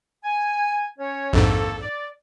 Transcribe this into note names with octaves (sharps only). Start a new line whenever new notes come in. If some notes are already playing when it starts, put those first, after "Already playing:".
G#5
C#4 C#5
A#1 F2 G#2 D#3 A#3 A4
D5